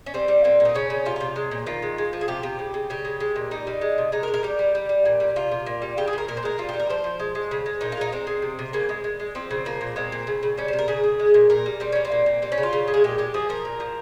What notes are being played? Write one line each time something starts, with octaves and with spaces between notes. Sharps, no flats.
C#4
G3 C4
G3
A#2 C4
A#2
D#4
C#3 C#4
C#3
C3 F4
C3 F4
G#3
A#2
D#3 F4
G#3
G#3
F3
G#4
C3 G4
C3
C#3
C#3
C#3 G4
G#3
G#3
A#2
G3 D#4
G3
G#3
C3
G#3 D#4
A#4
G#3
A#4
G3 G4
G3
G3
G3
A#2
G3
C3 F4
C3
A#2
G3
C#3 G4
G#4
C#3 A#4
A#2 A#4
C5
G#3 A#4
G3 F4
G3 G4
A#4
F3 C5
F3
G#3
G#3
C#3
G#3
A#2 D#4
F4
G#3 D#4
G#3 C4
G#3
C3
C3
C#3 A#3
G#3
G#3
G#3
F3 C4
C#3
F3 A#3
A#2
G#3 C4
A#2
C#3
C#3
G3 C#4
C3 C5
A#4
C#3 G#4
C#3
G#3
A#2
A#2 A#4
G3
G3 C4
G3 C#4
C4
A#2
A#2
G3 C4
C#4
C#3
F4
C#3
G#3
G#4
A#2 G4
G#3 G4
F3 G#4
F3 A#4
A#2
F3